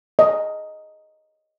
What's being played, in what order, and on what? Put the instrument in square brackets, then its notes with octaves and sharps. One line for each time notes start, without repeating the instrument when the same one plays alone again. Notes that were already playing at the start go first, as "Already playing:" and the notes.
[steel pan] D#5